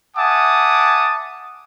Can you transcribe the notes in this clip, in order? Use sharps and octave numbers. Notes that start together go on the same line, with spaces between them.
E5 F#5 G#5 A5 D6 D#6